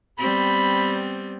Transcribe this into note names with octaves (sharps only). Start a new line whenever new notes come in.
G3 B3 C4 B5